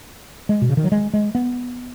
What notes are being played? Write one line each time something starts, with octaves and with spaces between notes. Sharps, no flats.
G#3
B2
C#3
D#3
F#3
G#3
G#3
B3